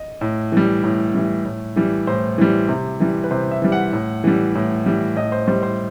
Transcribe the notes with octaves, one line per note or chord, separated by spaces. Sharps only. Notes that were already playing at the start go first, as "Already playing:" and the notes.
Already playing: D#5
A2
E3 G3
A2
E3 G3
A2
E3 G3
A2 C5
E3 G3
C3
E3 G3
B4
C3 C5
E5
E3 G3
F#5
A2
E3 G3
A2
E3 G3
A2 D#5
C5
G3 C5
C5